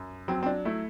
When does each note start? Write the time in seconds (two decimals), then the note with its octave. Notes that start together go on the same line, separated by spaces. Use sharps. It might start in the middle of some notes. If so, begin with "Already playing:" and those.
Already playing: F#2
0.28 F#3 C4
0.43 C4
0.46 D4
0.65 A3 E4